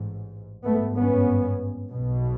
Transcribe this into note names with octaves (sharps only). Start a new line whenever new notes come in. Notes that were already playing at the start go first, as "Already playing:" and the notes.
Already playing: A1 G#2
G#1 G2 A3 B3
B3 C#4
B1 B2